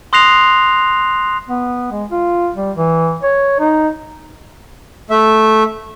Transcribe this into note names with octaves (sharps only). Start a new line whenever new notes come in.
C6 D#6 F#6 A#6 C7 F7
B3
G#3
F4
G3
E3
C#5
D#4
A3 E5